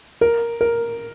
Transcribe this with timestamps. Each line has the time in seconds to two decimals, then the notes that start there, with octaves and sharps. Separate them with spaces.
0.21 A#4
0.61 A#4